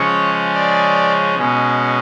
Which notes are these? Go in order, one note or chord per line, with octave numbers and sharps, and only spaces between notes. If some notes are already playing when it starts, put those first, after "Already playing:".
Already playing: C#3 F3 G#3 C#4 C#5
D5
B2 G#3 C#4